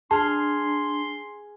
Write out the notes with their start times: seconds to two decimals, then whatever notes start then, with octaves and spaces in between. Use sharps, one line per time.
0.11 D4 G#4 A5 C6 F6